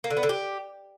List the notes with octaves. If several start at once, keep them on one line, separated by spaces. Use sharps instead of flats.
A#3
D3
B3
D3
G4